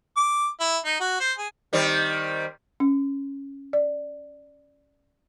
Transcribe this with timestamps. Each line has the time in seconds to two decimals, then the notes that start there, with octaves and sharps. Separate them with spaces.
0.17 D6
0.60 E4
0.85 D#4
1.00 F#4
1.20 C5
1.38 G#4
1.73 D#3 G3 C4
2.80 C#4
3.73 D5